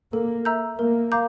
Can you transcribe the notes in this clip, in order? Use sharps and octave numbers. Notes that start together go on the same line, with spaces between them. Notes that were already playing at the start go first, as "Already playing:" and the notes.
A#3 A4
E5 A#5 E6 G6
A#3 A#4
F5 A#5 D6 G6